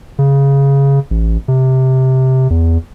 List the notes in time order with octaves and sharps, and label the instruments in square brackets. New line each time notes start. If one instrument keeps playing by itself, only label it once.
[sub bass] C#3
A1
C3
E2